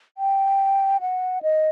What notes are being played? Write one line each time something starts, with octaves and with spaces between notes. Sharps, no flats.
G5
F#5
D#5